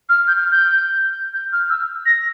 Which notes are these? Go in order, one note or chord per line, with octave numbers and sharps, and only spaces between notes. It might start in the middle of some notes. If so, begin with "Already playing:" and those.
F6
G6
F6
G6
G6
F6
E6
A#6